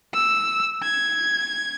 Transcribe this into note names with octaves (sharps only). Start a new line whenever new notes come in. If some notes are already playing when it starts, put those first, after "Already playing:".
E6
G#6